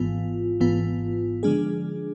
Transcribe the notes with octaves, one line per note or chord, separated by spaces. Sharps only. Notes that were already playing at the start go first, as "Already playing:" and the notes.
Already playing: G#1 G#2 E3 B3 F4
G#1 G#2 E3 B3 F4
D3 F3 G#3 D4 G#4